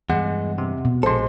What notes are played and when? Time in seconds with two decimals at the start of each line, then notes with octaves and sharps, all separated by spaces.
0.10 E2 G2 G#3 F#5
0.58 C3
0.85 B2
1.03 A#1 G#3 A4 C5 C6